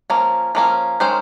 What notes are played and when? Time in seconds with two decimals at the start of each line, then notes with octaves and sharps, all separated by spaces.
0.10 F3 A#3 C#4
0.55 F3 A#3 C#4
1.00 D#3 G#3 C#4 C5